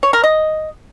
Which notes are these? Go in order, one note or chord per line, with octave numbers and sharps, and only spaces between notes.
C#5
A#4
D#5